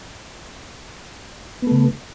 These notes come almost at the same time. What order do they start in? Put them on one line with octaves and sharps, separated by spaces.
B3 A3 C#3